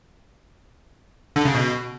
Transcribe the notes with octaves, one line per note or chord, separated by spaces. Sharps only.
D3
C#3
B2